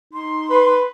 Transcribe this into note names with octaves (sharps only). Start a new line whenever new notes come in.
D#4 C6
B4